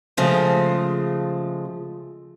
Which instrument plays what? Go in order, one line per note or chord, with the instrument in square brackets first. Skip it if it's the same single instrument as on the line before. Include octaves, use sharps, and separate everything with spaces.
[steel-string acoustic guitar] C#3 F3 G#3 A3